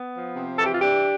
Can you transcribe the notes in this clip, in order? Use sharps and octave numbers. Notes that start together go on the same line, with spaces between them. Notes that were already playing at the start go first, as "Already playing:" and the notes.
Already playing: B3
F3
C3
E3 A4
G4
F4
D4 G4